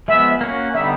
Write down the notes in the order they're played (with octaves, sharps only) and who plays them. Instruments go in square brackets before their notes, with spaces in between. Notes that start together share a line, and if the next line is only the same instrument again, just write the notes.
[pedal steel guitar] F3 G#3 B3 [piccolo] E5
[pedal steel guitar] A#3 C#4 F#4
[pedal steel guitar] D3 G3 B3 D#4 [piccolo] E5